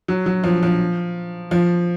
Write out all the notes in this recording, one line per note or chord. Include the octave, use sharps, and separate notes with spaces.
F#3
F#3
F3
F3
F3